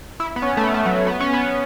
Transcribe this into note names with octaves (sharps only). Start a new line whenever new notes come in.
E4
B3
C#4
A3
B3
A3
F#3
B3
C#4
B3